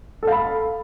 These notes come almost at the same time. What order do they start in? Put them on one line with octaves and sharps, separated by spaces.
A4 F5 B5